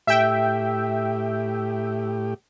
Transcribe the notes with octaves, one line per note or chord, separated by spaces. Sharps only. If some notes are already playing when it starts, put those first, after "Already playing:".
A2 G4 E5 G5